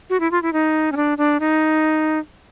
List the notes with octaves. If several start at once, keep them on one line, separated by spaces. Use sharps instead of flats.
F#4
E4
F4
E4
D#4
C#4
D4
D4
D#4